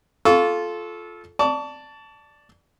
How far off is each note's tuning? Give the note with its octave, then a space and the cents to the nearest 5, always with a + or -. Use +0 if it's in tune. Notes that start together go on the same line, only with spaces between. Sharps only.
F4 +0 A4 -20 C#6 +25
D5 +0 A5 +5 C#6 +40